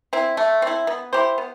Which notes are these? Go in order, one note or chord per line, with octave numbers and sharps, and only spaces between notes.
C4 E4
A3
C4 E4
B3
E4 G4 C5
B3